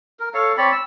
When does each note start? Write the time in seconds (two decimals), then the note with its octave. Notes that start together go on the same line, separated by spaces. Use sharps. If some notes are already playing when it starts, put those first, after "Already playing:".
0.20 A#4
0.34 A4 C#5 F5
0.57 C4 C#5 D5 B5
0.72 E6